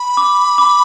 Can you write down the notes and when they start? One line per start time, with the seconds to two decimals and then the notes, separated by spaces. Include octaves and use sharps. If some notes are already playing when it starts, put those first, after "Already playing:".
Already playing: B5
0.17 D6
0.58 D6